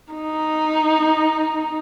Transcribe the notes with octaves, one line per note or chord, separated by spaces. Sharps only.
D#4